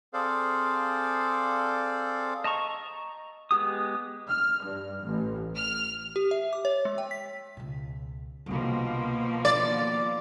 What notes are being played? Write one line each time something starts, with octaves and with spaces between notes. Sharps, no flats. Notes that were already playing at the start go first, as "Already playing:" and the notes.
C4 G#4 A4 C5 D5 F5
D#5 A5 A#5 C#6
G#3 B3 G4 D#6
F6
G2
A1
F6
G4
E5
D6
C#5
G#3
G5
B6
C#2 B2
C2 B2 D3 F3 A#3
D#3 D4 D5